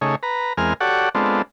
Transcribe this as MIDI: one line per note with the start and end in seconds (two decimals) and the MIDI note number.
0.01 0.15 49
0.01 0.15 57
0.01 0.15 63
0.01 0.15 68
0.01 0.15 73
0.23 0.53 71
0.23 0.53 82
0.57 0.73 40
0.57 0.73 56
0.57 0.73 60
0.57 0.73 70
0.57 0.73 80
0.57 0.73 89
0.80 1.09 66
0.80 1.09 67
0.80 1.09 69
0.80 1.09 73
0.80 1.09 74
0.80 1.09 78
1.15 1.42 56
1.15 1.42 59
1.15 1.42 60
1.15 1.42 62
1.15 1.42 65
1.15 1.42 69